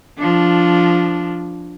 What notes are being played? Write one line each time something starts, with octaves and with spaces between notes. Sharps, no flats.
F3 D4